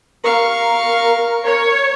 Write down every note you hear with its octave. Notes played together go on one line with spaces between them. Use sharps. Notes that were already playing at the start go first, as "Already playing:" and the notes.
A#4 F5 C#6
C#5